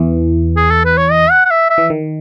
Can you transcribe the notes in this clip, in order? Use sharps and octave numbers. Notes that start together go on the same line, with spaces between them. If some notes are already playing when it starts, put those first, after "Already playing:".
Already playing: E2 E3
G#4
A4
B4
C#5
D#5
F#5
F#5
E5
E5
E3
D#3